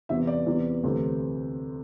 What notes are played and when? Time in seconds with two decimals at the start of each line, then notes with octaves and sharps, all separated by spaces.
0.09 E2 C3 E3 E5
0.27 D5
0.46 E2 C3 E3
0.84 D2 C3 E3